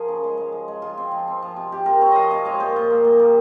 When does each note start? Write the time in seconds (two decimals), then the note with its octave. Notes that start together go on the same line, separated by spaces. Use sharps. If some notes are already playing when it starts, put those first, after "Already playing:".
Already playing: F3 G#4 A#4 F5
0.08 C#3
0.24 G#3
0.37 G#3
0.52 G#3
0.68 G#3
0.82 G#3 F4
0.98 C4
1.12 F3
1.27 C4
1.42 F3
1.56 C3
1.72 C3 G4
1.86 C3 A#4
2.01 C4 C#5
2.12 F3 D#5 F5
2.30 C3 D#5
2.45 G#3 C#5
2.60 A#2 C5
2.76 A#2
2.90 A#3
3.05 A#2
3.19 G3